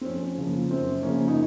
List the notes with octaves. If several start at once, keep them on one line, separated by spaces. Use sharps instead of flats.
C4
F2 C#4
C#3 F3 A#3
F#2 C4
C#3 F3 A#3 C#4
D#4